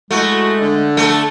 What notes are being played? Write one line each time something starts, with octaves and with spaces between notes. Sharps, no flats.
G#3 A3 E4 F#4
D3
A3 A4